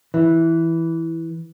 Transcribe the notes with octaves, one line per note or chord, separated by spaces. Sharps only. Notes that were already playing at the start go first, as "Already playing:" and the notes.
E3